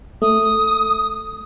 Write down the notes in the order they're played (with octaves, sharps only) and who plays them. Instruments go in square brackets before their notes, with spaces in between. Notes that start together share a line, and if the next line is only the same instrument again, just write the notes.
[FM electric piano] A3 [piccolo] D#6